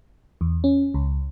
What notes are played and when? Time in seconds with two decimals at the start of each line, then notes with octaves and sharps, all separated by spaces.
0.41 E2
0.64 C#4
0.94 C#2